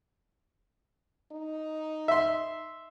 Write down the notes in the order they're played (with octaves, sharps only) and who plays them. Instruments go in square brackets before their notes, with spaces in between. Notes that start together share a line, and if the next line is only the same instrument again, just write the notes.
[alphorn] D#4
[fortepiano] E5 C6